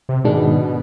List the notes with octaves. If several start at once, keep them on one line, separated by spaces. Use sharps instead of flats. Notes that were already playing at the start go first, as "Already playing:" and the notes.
C3
G#2 B2 D#3 G#3 D4